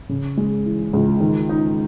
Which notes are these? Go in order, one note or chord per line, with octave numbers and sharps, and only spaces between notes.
C#3
G#3
E3
C#2
D#3
D#4